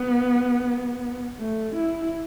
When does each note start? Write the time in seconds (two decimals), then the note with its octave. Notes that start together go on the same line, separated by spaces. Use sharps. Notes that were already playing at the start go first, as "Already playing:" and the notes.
Already playing: B3
1.39 A3
1.75 E4